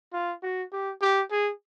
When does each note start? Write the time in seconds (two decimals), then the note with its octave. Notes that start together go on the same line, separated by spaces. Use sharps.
0.13 F4
0.43 F#4
0.72 G4
1.01 G4
1.31 G#4